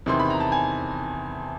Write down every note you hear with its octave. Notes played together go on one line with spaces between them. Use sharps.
E2 C3 D#3 C6
B5
A#5
A5
G#5